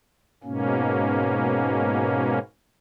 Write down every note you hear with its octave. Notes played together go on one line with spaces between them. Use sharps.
G#2 B2 A#3 C#4